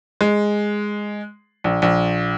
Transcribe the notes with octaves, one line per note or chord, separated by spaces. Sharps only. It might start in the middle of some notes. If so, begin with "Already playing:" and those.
G#3
A#1
A#1